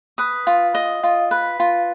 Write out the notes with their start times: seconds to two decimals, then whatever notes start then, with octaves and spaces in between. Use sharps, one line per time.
0.18 B4 D#6
0.47 F4
0.75 D#5
1.03 F4
1.31 B4
1.60 F4